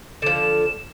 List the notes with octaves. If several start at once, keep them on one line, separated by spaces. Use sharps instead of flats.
D3 F3 E7